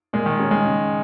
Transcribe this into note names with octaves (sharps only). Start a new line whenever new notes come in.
A#2 G#3
D#3
G#3 C#4
G#3
C#3